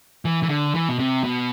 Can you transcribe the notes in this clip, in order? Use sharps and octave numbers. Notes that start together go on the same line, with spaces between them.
E3
E3
D3
E3
B2
C3
B2